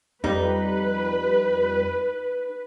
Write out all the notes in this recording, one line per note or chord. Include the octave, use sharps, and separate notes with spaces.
F2 G3 D#4 B4